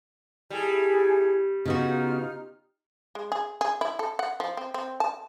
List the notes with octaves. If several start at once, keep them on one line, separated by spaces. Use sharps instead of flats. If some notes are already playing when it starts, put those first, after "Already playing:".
G3 E4 G#4 A4
C#3 B3 D#4 F4 F#4 F6
G#3
G#4
G#4
E4
A4
F#5
F3
C4
C4
A5